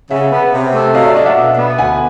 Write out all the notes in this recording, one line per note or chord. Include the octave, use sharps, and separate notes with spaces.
C#3 E5 F#5
B3
C3
A3
F#3 D#5 F5
D5 E5
D4 D#5 F5
E5 F#5
B2
B3
D2 F#5 G#5